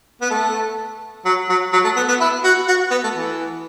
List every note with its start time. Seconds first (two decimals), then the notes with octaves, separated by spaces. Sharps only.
0.21 B3
0.30 A3
1.25 F#3
1.49 F#3
1.73 F#3
1.84 A3
1.96 B3
2.08 B3
2.20 E4
2.44 F#4
2.68 F#4
2.91 B3
3.04 A3
3.15 E3